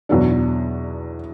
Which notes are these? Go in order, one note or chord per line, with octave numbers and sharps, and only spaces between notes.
E2 B2 F#3 B3 D4